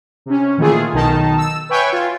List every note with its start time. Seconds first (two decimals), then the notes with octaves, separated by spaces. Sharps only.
0.26 C3 C#4
0.57 A#2 D#3 E3 A3 F4 G#4
0.93 B1 B2 D#3 D#4 A5
1.38 E6
1.69 B4 C#5 E5 G5 G#5 C#6
1.92 F4